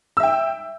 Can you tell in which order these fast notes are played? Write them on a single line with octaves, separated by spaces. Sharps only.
E6 E5 G5